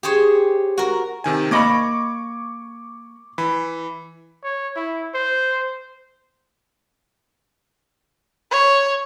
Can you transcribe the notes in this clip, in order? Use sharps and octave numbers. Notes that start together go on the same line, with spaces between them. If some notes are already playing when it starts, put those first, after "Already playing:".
G4 G#4 C5 C#5
F#4 A#4
C3 D#3 G#5
A#3 D#5 B5 C#6 D6 G#6
E3 B5
C#5
E4
C5
C#5